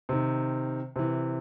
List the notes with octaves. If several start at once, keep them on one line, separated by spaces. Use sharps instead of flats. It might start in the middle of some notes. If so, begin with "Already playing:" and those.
C3 D#3
C3 E3